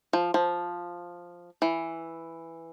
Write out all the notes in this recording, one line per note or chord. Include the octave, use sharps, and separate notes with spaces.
F3
F3
E3